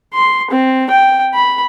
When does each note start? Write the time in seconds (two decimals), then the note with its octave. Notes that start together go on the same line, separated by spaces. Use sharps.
0.14 C6
0.51 C4
0.90 G5
1.34 B5